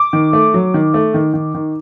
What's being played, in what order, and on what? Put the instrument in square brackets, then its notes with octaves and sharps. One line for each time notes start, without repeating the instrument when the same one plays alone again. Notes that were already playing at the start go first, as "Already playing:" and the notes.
Already playing: [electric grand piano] D6
[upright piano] D#3
A3
F#3
D#3
A3
D#3
D#3
D#3